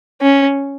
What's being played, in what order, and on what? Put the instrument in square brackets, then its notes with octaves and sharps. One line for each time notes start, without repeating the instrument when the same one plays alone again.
[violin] C#4